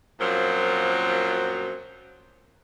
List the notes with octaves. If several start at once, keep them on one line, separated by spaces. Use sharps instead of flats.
F#2 A#2 F3 F#3 A#3 C4